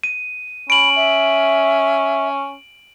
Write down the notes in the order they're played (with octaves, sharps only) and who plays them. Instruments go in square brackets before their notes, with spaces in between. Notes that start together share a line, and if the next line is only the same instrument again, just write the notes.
[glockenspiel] D#7
[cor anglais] C#4 [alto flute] B5 [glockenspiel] D7 F#7
[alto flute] E5